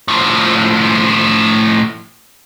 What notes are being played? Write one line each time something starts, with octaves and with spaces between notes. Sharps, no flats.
A2 F3